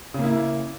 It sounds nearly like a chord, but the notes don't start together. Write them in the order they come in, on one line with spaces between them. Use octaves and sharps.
C#3 A#3 E4